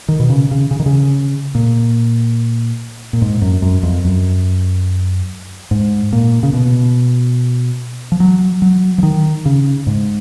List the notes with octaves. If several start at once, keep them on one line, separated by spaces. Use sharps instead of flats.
D#3
B2
C#3
C#3
C#3
D#3
C#3
A#2
A#2
G#2
F#2
F#2
F2
F#2
G#2
A#2
C#3
B2
F3
F#3
F#3
F3
D#3
C#3
G#2